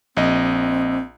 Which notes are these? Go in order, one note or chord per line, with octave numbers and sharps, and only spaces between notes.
A#1 C4 D#5